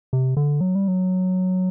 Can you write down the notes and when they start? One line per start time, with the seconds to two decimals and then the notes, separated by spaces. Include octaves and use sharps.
0.13 C3
0.37 D3
0.61 F#3
0.75 G3
0.88 F#3